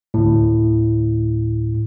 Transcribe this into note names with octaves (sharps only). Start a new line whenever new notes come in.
D2 A2